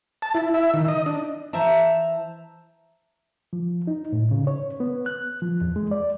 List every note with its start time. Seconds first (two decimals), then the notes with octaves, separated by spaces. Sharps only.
0.22 A5
0.34 E4
0.54 E5
0.74 D#3
0.88 D#5
1.06 D4
1.53 E3 C5 E5 A5 A#5
3.53 F3
3.87 D#4
4.12 A2
4.31 C#3
4.47 C#5
4.80 B3
5.06 F#6
5.42 F3
5.61 E2
5.76 G#3
5.91 D5